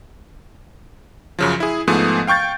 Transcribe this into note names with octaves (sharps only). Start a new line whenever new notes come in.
F#2 C#3 F3
E4 G#4
G#2 F3 A3 B3 G#4
F5 G5 C#6 G6 A6